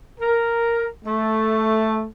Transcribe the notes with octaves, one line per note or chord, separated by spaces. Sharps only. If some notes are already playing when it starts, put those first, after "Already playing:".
A#4
A3